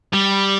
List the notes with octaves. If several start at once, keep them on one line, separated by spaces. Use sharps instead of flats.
G3